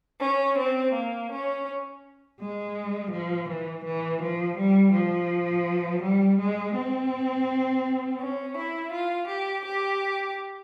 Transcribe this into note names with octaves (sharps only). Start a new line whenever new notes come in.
C#4
C4
A#3
C#4
G#3
F3
E3
E3
F3
G3
F3
G3
G#3
C4
C#4
E4
F4
G4
G4